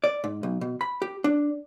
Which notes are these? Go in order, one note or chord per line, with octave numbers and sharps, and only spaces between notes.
D5
G#2
B1
B2
B5
G4
D4